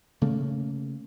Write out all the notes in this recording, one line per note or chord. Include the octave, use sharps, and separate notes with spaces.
C#3 A3 A#3